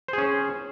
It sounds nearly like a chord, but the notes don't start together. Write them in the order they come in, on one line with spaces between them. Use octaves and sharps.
C5 G#4 C#4